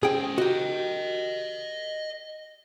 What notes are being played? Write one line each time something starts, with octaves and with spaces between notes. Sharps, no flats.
C#4 G#4 C5 G5
F#4 G4 D#5 G5